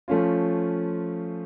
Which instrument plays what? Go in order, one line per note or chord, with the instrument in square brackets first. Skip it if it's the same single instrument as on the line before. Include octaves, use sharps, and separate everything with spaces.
[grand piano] F3 A3 C#4 F4